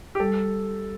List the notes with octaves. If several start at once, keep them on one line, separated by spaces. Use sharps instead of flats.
G4
G3 A4